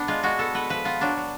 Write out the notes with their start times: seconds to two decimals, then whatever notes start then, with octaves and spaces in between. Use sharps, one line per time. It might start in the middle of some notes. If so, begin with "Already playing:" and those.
Already playing: B3 D4
0.08 G#3 F4
0.23 G#3 F#4
0.39 B3 A4
0.54 B3 B4
0.70 F3 B4
0.85 B3 F4
1.01 F#3 D4
1.17 F#3